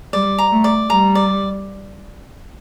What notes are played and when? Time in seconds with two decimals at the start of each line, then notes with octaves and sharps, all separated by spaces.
0.13 G3 D5
0.38 A#5
0.51 A3
0.64 D5
0.90 G3 A#5
1.15 D5